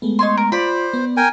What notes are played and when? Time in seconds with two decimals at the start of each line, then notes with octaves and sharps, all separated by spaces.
0.02 G#3 A3 B3
0.19 D#4 C#5 C6
0.37 A#4
0.52 F4 C5 D5 B5
0.94 B3
1.17 A#4 G5 G#5